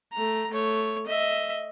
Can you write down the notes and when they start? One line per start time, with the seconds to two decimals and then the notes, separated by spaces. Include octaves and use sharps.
0.13 A3 A#5
0.51 A3 C#5
1.07 D#5 E5